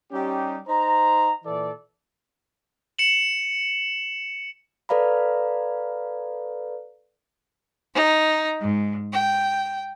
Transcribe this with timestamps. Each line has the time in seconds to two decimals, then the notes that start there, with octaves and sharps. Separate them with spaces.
0.12 G3 C#4 D#4 G4
0.68 D#4 C5 A#5
1.45 A#2 E3 A4 D5
2.99 C#7 E7 F#7
4.89 A4 B4 D5 F5 A#5 B5
7.94 D#4
8.61 G#2
9.12 G5